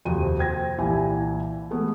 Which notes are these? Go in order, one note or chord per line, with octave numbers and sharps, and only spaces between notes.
D#1 F2 C3 C4 F#4 D#7
C5 G5 G#6 A#6
C2 A#2 E3 E4 G4 G#5
E3 G#3 A3 B3